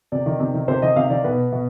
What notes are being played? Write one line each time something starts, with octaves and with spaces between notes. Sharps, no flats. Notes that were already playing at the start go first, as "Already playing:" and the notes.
C3 D5
D#3
C3
D#3
C3 C5
D#3 D#5
C3 F5
D#3 D5
B2 B4
B2